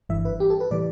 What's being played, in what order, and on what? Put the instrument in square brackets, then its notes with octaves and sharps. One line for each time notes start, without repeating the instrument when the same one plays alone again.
[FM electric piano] G1 G2 E3 E5
B4
G4
A4
B4
A2 E3 G3 D5